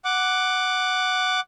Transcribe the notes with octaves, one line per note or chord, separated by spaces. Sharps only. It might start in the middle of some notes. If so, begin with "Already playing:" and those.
F#5 D6